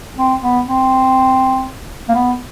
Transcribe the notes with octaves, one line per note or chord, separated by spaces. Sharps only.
C4
B3
C4
A#3
B3